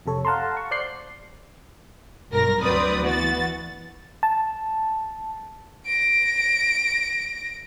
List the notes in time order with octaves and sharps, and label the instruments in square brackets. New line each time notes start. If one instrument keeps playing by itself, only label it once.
[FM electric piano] F2 C3 A4 C#5
F5 F#5 A5 A#5 C6
C#6
C5 D5 F#6 G6 C7
[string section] B1 G2 A#4 A#6
D2 F#3 C4 B4 D5 D#6
E3 B3 F#4 A6
[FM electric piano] A5
[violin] A#6 D7